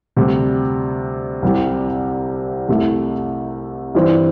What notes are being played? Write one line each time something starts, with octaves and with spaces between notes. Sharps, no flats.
D2 C3 G3
C2 C3 G3 E4 G4
C2 C3 A3 E4
G2 E3 C4